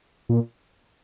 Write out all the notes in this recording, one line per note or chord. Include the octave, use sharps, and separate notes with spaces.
A#2